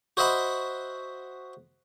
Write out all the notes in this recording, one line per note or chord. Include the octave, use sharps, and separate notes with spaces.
F#4 C5 D#5 E5 F#5 B5